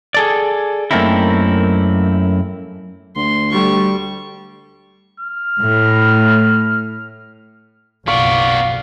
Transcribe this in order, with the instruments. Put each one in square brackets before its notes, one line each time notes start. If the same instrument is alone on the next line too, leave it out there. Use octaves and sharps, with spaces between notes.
[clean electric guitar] G#4 A4 D5
F#2 A3 A#3 C4 D#4 E4
[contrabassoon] D2 [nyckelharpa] C6
[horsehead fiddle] G3 [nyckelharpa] A4 C#6
[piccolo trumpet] F6
[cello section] A2
[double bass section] F#1 B1 F2 [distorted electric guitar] B3 D5 [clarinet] F5 [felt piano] C#6